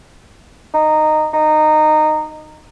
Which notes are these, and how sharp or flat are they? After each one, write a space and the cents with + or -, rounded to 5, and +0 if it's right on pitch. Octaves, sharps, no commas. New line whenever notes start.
D#4 -15
D#4 -15